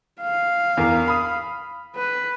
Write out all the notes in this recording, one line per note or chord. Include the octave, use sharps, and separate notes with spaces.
F5
E2 A#4
B5 D#6
B4